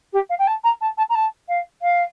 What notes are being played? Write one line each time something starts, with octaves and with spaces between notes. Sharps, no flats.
G4
F5
G5
A5
A#5
A5
A5
A#5
A5
F5
F5